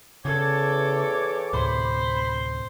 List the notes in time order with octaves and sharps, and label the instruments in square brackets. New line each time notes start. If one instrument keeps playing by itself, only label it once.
[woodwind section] E2 C#5 D6 [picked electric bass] C#3 [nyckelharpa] A4 [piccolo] G#6
[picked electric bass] D2 A2 C3 [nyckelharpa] C5 [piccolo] B5